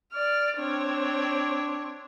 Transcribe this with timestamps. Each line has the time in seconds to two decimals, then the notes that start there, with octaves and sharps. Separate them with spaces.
0.13 D5 F6
0.58 C4 D4 C#5